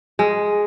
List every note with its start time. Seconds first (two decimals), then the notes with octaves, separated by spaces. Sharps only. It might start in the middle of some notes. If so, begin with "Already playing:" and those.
0.19 G#3